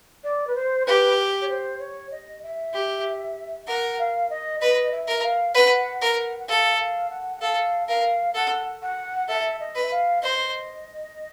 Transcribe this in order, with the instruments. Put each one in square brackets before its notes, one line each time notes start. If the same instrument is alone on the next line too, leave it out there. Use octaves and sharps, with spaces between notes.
[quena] D5
B4
C5
[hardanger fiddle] G4 [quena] B4
[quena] C#5
C5
C#5
D#5
E5
[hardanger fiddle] G4
[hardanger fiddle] A#4 [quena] F#5
[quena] F5
D#5
[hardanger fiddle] B4 [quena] D#5
[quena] E5
[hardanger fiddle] A#4
[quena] E5
F5
[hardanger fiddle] B4 [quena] F#5
[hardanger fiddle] A#4 [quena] F#5
[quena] F#5
[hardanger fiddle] A4 [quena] F5
[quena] F5
F#5
F#5
[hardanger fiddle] A4 [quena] F5
[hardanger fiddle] A#4 [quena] F5
[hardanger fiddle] A4 [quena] F#5
[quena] F#5
[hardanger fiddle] A4 [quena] E5
[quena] D#5
[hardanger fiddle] B4
[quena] E5
F5
[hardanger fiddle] C5 [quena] D#5